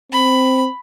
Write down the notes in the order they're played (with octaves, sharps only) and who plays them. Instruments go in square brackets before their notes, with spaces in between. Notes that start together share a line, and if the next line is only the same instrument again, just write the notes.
[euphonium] C4 [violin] B5